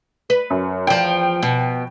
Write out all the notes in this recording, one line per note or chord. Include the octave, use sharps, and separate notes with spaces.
B4
F#2
E2 F3 G5
B2